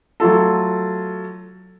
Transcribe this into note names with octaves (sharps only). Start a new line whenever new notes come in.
F#3 A3 F4 A4